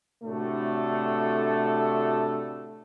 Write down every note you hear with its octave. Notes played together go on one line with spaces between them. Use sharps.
A2 C3 A3 D4 F#4 A4